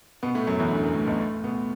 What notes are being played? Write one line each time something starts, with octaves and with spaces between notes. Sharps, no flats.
B2 B3
A2 A3
F#2 F#3
E2 E3
D2 D3
F#2
A2
B1 B2
A2 A3
B2 B3